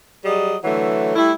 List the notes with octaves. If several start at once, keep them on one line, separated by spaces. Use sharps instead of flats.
F#3 G3 G#4 D#5
D3 E3 F#3 A3
G3 A3 E4